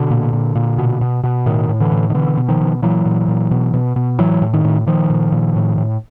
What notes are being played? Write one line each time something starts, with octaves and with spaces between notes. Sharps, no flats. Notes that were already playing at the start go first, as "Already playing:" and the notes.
Already playing: B2 D3
A#2
A#2
A#2
B2
B2
B2
A2 D#3
A2
D3 E3
A2
D#3
B2 D3 E3
B2
D#3 F3
B2
A#2 E3 F#3
A#2
A#2
B2
B2
B2
A2 E3 F#3
A2
D#3
A2
A#2 D#3 F3
A#2
A#2
A2
A2